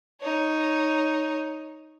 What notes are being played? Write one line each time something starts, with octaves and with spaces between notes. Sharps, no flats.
D#4 C#5